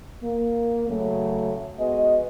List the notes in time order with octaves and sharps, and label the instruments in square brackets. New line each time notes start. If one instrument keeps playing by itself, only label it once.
[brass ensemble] A#3
C#3 F#3 A3
G#3 B3 F#4 D#5